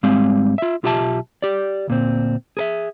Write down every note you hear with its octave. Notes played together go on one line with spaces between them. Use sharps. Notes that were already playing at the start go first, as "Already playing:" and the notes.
G#2 G3 G#3 C4 F5
F4 E5
B1 F4 G4 E5 F#5 A5
G4 D5
D2 A#2 C4
G#4 A#4 E5